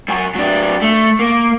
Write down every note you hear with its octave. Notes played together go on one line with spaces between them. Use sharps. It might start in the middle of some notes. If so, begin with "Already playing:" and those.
F#2 G#5
F#3 D4
A3
A#3